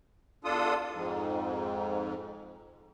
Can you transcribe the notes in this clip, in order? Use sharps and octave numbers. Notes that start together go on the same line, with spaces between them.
E2 D4 F4 A4 D#6
F2 G#2